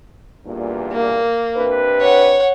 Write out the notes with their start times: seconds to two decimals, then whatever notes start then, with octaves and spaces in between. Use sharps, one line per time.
0.47 E2 G2 A#2
0.92 A#3
1.57 C3 D4 B4
2.01 C#5 F#5